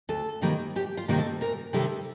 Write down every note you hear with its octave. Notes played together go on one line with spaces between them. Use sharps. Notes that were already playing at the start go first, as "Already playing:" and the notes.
D2 A4
C3 D#3 G3 A#3
D2 G4
F4
C3 D#3 G3 A#3
A4
D2 A#4
C3 D#3 G3 A#3 A4